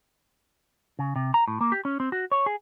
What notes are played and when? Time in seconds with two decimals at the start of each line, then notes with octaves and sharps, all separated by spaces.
0.99 C#3
1.16 C3
1.34 A#5
1.48 A2
1.61 A#3
1.72 G4
1.85 C#4
2.00 C4
2.12 F#4
2.32 C#5
2.46 G#4